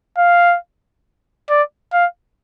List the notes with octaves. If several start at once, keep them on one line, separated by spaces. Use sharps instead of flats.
F5
D5
F5